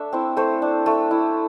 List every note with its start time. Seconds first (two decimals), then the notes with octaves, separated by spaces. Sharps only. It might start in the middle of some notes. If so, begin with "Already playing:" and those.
Already playing: A3 D4 E5
0.13 C4 E4
0.37 A3 C5
0.62 D4
0.86 A3
1.11 E4